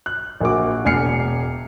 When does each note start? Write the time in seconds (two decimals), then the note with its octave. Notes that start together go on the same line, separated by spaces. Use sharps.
0.06 F#6
0.41 A#1 A#3 F#4 D6
0.85 E1 G#5 F6 C7 C#7